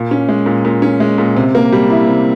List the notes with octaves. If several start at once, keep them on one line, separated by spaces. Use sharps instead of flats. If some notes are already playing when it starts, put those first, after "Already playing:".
Already playing: A#2
C#4
G#3
A#2
A#2
C#4
G#3
A#2
C3
A#3
G3
E4
C3